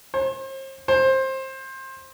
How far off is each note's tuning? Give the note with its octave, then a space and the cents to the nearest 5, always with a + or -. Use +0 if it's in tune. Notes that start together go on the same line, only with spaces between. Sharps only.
C5 +40
C5 +20